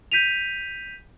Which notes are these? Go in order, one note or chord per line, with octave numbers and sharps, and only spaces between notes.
G6 B6 D#7 F7